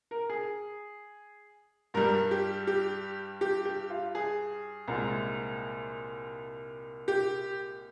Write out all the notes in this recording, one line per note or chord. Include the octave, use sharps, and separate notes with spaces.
A#4
G#4
G2 G3 A#4
G4
G4
G4
G4
F4
G#4
C2 A#2 G#3
G4